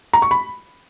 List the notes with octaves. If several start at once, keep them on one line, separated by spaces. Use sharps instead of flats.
A#5
C#6
B5